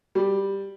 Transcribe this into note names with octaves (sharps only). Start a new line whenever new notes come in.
G3